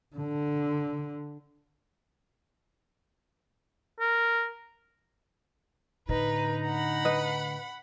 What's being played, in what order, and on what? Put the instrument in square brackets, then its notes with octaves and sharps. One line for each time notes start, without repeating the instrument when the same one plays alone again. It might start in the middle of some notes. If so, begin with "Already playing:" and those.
[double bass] D3
[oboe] A#4
[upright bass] A2 D3 [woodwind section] D#4 A#5 [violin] B4
[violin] F#5 B5
[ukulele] B4 D#5